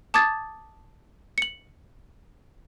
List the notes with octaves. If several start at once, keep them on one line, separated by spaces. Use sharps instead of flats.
A5 D6 D#6 G#6 A6
C#7 F#7